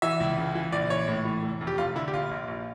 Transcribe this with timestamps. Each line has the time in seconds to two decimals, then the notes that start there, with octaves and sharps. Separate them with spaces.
0.02 E3 E5
0.20 C#2
0.37 C#3
0.55 E3
0.72 A#1 D5
0.90 E3 C#5
1.08 A2
1.25 E3
1.43 F1
1.61 F2
1.67 G4
1.78 F1 F4
1.95 D3 E4
2.08 G4
2.13 A#1 F4
2.31 A#1
2.48 A#1